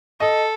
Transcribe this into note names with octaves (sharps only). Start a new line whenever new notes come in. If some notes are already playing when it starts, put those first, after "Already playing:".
A4 D#5